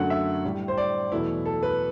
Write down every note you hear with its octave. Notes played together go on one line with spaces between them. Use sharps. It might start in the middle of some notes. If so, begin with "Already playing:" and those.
Already playing: F#2 D3 F#3 A3 F#5
E5
A2 G3
C5
D5
E2 B2 F#3 A3 E4
A4
B4